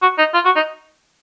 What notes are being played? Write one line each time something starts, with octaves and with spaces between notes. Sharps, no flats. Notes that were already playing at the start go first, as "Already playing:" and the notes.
F#4
D#4
F4
F#4
D#4